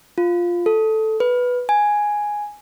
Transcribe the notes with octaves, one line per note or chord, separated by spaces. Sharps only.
F4
A4
B4
G#5